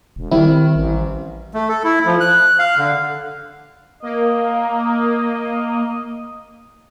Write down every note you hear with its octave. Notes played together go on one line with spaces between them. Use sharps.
E1
D#3 G3 C4 E4
A1
A3
A4
E4
F3
F#6
F5
D3
A#3 D#5